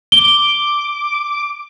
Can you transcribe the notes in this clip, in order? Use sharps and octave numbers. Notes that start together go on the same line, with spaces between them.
D6 G7